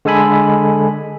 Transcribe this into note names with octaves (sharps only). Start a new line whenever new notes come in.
D3 G#3 A4 G#5 B5